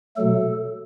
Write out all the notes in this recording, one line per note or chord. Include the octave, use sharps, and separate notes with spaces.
B2 F#3 A3 A4